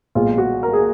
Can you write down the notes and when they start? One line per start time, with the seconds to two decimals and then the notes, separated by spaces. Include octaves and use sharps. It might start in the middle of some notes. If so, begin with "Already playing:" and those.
0.15 B1 A#2 G#3 F4
0.38 F#4
0.63 A#4
0.73 G#4